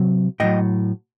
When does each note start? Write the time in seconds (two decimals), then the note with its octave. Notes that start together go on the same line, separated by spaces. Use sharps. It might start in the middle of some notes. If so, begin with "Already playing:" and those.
Already playing: C3 F#3
0.40 A2 F#3 D#5 G5